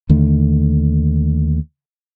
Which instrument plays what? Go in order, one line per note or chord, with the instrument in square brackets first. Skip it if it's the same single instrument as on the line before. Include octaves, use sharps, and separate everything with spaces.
[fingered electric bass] D#2 D3 A3